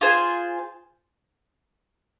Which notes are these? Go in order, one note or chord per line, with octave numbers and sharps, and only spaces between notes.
F4 G#4 C5 G#5